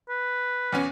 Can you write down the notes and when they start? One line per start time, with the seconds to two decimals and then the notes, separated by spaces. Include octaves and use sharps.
0.09 B4
0.72 E2 B3 C#4